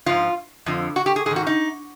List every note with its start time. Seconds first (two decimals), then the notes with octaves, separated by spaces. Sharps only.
0.06 G#2 F3 F4
0.66 F2 D3 F3
0.96 F#4
1.06 G4
1.16 G#4
1.26 G#2 D#3 G#4
1.36 F#4
1.47 D#4